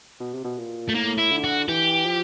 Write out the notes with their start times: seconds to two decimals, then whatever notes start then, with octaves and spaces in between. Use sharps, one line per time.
0.20 B2
0.33 C3
0.44 B2
0.58 A#2
0.89 A3
0.94 A2 A#3
1.18 E4
1.31 D3
1.44 F#4
1.68 E3 G4
2.06 F3